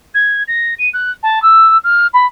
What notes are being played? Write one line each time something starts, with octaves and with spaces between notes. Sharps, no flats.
G#6
A#6
D#7
F#6
A5
E6
F6
B5